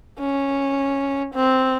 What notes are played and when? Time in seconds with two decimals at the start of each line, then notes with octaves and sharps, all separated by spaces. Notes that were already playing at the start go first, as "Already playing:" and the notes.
0.19 C#4
1.34 C4